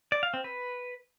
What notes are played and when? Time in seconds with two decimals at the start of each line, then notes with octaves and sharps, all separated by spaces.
0.12 D5
0.23 F5
0.34 C4
0.44 B4